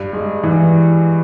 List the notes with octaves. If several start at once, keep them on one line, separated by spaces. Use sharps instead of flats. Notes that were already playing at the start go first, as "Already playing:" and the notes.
Already playing: G2
G#3
E3